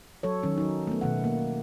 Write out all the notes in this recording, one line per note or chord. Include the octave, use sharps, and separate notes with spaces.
F#3 A4 C#5
D#3 F#3 C#4
F#3 D#4
A3 B3
B2 D#3 F#5
A#3